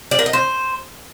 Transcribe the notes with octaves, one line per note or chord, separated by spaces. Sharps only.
D5
A#4
D#5
C5